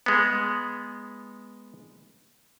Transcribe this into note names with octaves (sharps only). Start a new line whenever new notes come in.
G#3 B3